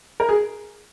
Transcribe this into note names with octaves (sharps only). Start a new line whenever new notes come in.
A#4
G#4